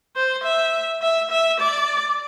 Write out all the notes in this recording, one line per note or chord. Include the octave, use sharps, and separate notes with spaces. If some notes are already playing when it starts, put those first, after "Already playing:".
C5
E5
E5
E5
D5